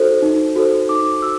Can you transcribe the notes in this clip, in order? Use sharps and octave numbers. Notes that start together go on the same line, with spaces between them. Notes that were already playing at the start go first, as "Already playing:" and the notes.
Already playing: D#4 F#4 A4 C5
D#4
F#4 A4 C5
D#4 D6
F#4 E6